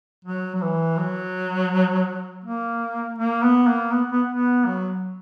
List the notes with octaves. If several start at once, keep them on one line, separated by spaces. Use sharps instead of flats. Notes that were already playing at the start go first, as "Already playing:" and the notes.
F#3
F#3
E3
F#3
A#3
A#3
B3
A#3
B3
B3
B3
F#3